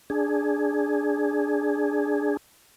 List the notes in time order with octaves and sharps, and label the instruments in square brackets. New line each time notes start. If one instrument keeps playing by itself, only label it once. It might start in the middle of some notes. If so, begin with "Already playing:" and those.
[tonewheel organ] D4 G#4